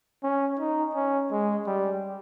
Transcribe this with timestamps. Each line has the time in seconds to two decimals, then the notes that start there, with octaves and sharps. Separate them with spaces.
0.24 C#4
0.59 D#4
0.95 C#4
1.31 G#3
1.67 G3